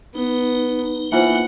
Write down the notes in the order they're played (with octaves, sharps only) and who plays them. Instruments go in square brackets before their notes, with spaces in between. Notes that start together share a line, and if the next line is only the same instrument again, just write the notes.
[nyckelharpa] B3 [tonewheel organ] D#4
[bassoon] E3 [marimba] A#3 F4 C5 [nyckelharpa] F#5